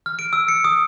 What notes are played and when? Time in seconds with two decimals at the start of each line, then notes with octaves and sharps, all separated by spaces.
0.06 F6
0.19 D7
0.33 E6
0.48 C#7
0.64 D#6